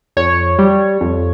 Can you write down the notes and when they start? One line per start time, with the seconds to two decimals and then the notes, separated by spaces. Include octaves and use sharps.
0.17 F2 C#5
0.59 G3
1.01 F2